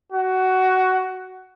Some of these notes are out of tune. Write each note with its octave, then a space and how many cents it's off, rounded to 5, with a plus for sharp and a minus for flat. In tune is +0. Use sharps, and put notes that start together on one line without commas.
F#4 +15